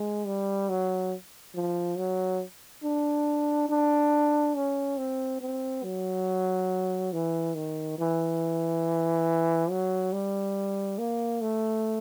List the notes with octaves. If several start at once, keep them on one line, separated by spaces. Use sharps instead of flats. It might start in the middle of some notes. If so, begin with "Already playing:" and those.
Already playing: G#3
G3
F#3
F3
F#3
D4
D4
C#4
C4
C4
F#3
E3
D#3
E3
F#3
G3
A#3
A3